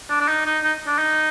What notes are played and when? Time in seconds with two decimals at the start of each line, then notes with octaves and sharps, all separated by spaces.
0.10 D4
0.20 D4
0.28 D#4
0.45 D#4
0.64 D#4
0.87 D4
0.98 D#4